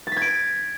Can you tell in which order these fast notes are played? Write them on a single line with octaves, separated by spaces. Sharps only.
A6 B6 G#6 D7